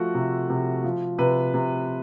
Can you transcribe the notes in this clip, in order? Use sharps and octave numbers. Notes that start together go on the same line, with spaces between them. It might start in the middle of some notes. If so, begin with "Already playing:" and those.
Already playing: F3 A3 F#4
C3
C3
F3
C3 B4
C3